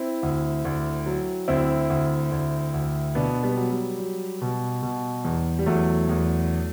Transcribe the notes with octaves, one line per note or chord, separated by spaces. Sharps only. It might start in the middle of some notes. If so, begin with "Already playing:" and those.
Already playing: C4 E4
D2
D2
F#3
D2 C4 E4
D2
D2
D2
B2 B3 D4
G3 B3
F#3
G3
F#3
B2
B2
E2
G3
E2 F#3 A3
E2